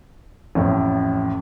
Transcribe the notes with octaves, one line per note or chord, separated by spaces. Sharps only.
A1 F2 A2